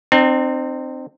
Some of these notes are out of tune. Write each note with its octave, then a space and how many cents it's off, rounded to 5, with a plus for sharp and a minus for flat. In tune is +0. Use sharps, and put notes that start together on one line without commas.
C4 +0 D#4 -45